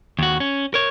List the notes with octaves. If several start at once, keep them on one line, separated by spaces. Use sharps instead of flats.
D#2 F#4
C#4
A#4 C#5